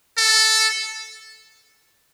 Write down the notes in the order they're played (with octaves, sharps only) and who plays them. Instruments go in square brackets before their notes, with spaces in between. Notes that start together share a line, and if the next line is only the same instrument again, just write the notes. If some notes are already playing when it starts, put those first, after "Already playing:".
[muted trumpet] A4